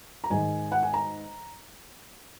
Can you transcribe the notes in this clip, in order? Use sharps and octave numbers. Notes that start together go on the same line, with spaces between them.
A#5
G#2 D#3 G#3 G#5
F#5
G#5
A#5